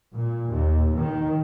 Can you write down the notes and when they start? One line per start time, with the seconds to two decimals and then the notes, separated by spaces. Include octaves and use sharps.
0.14 A#2
0.51 D#2
0.97 D#3